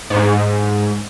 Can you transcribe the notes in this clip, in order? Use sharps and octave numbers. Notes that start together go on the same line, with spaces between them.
G#2